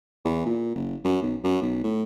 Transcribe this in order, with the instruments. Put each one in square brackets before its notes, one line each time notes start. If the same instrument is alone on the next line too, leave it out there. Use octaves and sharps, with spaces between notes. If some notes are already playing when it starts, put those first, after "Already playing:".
[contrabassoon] E2
A#2
F#1
F#2
B1
F#2
B1
A2